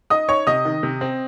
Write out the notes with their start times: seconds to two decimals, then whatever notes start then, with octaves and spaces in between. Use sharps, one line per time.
0.10 D#4 D#5 D#6
0.29 D#4 C#5 C#6
0.47 C3 D#5 D#6
0.65 D#3
0.83 C3
1.01 C4